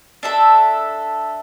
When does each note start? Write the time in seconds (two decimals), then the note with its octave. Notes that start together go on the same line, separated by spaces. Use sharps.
0.23 D4 A4 E5